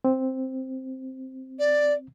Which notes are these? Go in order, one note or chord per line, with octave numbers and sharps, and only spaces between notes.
C4
D5